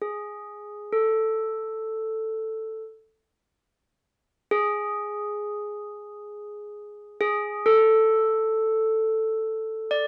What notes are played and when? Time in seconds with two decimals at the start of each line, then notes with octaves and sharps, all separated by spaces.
0.02 G#4
0.93 A4
4.51 G#4
7.21 G#4
7.66 A4
9.91 D5